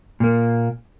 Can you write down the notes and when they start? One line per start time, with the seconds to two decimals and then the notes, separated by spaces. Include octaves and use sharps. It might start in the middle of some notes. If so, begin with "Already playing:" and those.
0.20 A#2 A#3